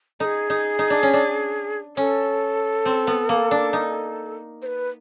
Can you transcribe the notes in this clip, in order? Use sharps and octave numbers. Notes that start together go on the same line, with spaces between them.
D#4 G#4 A4
D#4
D#4
D4
C#4
D4
C#4 A4
C4
B3
A#3
D4
D#4
C5
B4